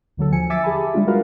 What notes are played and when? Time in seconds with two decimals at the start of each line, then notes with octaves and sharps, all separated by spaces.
0.17 D#2 D3 F#3 A4
0.32 F3 G#5 C#7
0.50 E5 G#5 D6 E6 A6 B6
0.63 G4 G#4 E5 G#5 A5 B5
0.94 G3 G#3 D4 F4
1.07 G#3 F#4 A#4 B4 F5